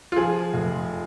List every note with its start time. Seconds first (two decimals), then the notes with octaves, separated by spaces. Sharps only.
0.12 F4
0.16 F3 G#4
0.54 F1